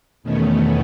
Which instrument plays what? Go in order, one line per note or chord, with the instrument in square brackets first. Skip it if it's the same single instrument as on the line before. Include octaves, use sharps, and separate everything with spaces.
[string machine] E2 B2 D#3 A3 B3 C#4